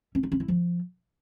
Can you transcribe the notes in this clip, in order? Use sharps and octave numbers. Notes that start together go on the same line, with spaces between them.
C#4
D#4
C#4
E4
F3